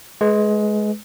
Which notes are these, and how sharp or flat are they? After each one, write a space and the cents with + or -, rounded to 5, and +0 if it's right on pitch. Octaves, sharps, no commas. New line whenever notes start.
G#3 +20 B4 +0